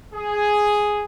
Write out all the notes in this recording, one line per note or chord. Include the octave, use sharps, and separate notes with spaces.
G#4